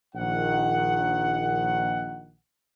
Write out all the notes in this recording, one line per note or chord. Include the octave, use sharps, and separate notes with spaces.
A#1 D#3 F#5